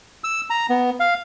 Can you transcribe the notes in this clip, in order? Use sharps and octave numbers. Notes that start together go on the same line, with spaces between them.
E6
A#5
B3
F5